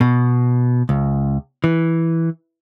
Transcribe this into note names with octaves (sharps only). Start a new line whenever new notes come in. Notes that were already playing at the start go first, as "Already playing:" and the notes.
B2
C#2
E3